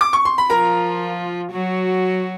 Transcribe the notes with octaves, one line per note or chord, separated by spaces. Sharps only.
D6
C#6
C6
B5
F3 F4 A#4 A#5
F#3 F#4